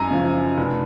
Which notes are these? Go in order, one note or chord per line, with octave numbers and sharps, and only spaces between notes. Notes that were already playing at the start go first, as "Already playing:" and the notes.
Already playing: F#2 G#5 A#5
C#3 F3
F1